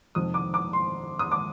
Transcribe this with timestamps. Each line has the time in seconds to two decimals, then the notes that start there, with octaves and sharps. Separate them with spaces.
0.15 F2 C3 D#3 D#6
0.34 D6
0.54 D6
0.73 C6
1.19 D#6
1.31 D6